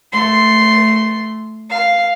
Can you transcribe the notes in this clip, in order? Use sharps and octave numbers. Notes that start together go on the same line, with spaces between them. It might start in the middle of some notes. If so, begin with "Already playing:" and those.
A3 C6
F5